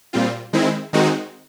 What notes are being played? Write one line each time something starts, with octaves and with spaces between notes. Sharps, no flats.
A#2 G3 C4 F4
D#3 G#3 C4 E4
D#3 G#3 C4 D#4 F#4